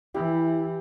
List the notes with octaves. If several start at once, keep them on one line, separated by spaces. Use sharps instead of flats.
E3 E4 G4